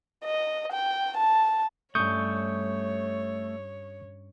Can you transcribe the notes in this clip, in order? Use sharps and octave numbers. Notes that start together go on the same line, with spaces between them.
D#5
G5
A5
G2 A3 C#4 C#5 C#6 D#6 G6